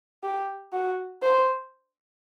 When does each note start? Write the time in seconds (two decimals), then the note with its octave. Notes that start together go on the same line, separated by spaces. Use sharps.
0.23 G4
0.73 F#4
1.22 C5